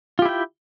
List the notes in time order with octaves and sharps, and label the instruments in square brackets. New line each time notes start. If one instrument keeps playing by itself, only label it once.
[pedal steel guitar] F4
G4
E4
G5